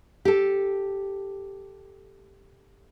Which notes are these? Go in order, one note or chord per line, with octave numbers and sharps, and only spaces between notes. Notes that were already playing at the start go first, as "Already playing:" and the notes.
G4 A4